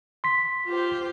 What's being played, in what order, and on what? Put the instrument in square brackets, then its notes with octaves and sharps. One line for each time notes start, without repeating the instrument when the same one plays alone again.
[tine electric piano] C6 B6
[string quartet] F4 G4 C5